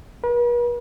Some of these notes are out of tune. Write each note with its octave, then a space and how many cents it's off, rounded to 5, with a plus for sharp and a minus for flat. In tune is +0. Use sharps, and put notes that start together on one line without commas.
B4 -45